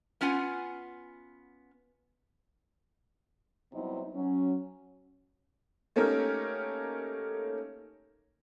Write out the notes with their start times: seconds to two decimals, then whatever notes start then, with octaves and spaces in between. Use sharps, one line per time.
0.21 B3 C#4 F4 F#5 G#5
3.73 C3 F#3 G3 B3 D#4 E4
4.14 F#3 C#4
5.96 A3 A#3 C#4 D#4 G4 A#4